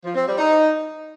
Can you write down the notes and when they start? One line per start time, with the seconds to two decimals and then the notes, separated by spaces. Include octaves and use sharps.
0.04 F3
0.15 C4
0.26 G3
0.37 D#4